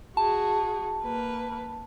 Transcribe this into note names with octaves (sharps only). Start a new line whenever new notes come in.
F#4 G#4 A5
A#3 B4